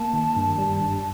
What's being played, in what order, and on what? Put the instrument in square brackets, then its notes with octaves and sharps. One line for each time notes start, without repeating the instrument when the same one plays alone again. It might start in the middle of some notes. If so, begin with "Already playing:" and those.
Already playing: [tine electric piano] A#3 [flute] A5
[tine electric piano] D#3
G2
G3
G2